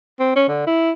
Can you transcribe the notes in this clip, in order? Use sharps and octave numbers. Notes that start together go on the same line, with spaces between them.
C4
C#4
D3
E4